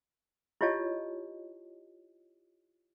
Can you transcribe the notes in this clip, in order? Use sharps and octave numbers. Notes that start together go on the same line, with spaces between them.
E4 F4 G4 C#5 D#5 A5